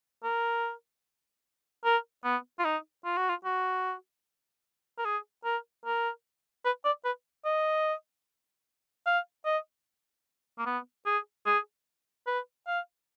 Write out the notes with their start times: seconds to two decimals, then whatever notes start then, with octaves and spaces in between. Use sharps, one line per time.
0.24 A#4
1.85 A#4
2.24 B3
2.59 F4
2.64 D#4
3.05 F4
3.17 F#4
3.29 F4
3.45 F#4
4.98 A#4
5.05 G#4
5.45 A#4
5.85 A#4
6.65 B4
6.85 D5
7.05 B4
7.45 D#5
9.06 F5
9.45 D#5
10.59 A#3
10.66 B3
11.06 G#4
11.46 G#4
12.27 B4
12.67 F5